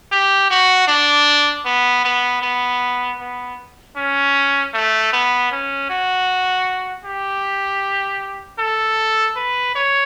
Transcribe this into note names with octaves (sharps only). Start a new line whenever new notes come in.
G4
F#4
D4
B3
B3
B3
B3
C#4
A3
B3
C#4
F#4
G4
A4
B4
C#5